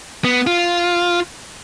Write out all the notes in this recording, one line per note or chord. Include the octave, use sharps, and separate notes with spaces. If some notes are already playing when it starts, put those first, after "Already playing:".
B3
F4